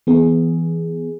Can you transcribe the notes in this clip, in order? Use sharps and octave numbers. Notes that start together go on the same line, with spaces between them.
E3 B3 G#4